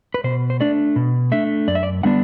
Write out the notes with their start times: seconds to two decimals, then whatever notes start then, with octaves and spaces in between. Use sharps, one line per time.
0.14 B4
0.24 B2 C5
0.50 C5
0.60 A3 D4 D5
0.96 B2
1.32 A3 D4 E5
1.68 F#2 D5
1.75 E5
1.83 D5
2.03 D3 G3 B3 D4 F#5